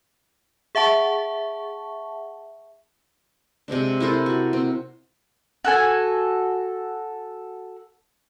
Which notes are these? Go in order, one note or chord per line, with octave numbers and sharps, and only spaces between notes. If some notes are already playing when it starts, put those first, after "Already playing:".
G#4 E5 F#5 A5 C#6
C3 G#3 C4 D4
E4 A4 A#4 C5
F#4
C4
F#4 A4 G#5